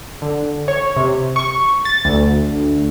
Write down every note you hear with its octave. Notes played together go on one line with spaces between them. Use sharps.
D3
C#5
C3
C#6
A6
D2